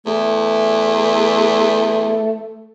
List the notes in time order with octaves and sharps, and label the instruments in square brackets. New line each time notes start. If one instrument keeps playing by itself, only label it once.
[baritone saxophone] E2 [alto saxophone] A3